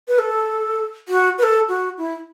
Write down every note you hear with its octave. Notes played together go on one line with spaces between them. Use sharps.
B4
A4
F#4
B4
A4
F#4
E4